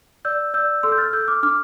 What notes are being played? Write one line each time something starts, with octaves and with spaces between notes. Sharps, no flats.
D5 E6 G6
D5 E6 G6
A4 C6 E6
G6
F6 A6
A4 E6 G6
D6 F6
D4 D6 F6